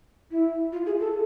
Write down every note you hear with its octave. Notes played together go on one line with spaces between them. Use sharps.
E4
F4
G#4
A4